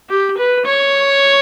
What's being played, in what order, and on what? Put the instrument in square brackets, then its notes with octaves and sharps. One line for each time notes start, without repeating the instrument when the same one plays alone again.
[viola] G4
B4
C#5